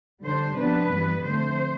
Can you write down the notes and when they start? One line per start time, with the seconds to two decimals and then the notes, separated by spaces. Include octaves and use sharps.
0.23 D3 G3 D4 C5
0.57 C3 F3 B3 D4 B4
0.91 G2 E3 G3 B3
1.23 D3 F3 A3 C4 C5